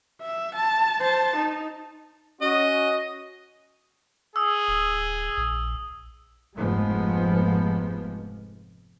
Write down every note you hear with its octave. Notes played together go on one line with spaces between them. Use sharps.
E5
A5
C5 A5
D#4
C#4 F#4 D#5
G#4 D#6 E6
D1
A#1
F1 G#2 F3 G#3 B3